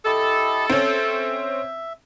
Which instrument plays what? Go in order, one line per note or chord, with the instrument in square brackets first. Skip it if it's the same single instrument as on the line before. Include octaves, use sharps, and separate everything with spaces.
[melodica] E4 G4 D#5 [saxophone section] A4
[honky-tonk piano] C4 C#4 [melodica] E5